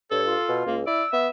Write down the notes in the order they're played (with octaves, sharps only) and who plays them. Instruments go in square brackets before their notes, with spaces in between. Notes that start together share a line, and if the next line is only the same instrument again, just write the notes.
[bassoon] G2 [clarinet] A4 [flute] C#5
[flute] F4
[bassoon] B2
[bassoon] C#2 [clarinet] A#3
[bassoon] E4 [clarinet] D5 [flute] E6
[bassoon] B3 [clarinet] E5